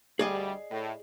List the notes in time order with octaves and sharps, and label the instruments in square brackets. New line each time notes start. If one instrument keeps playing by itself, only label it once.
[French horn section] D2 G3 [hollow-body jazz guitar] G#4 D5 D#5
[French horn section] A2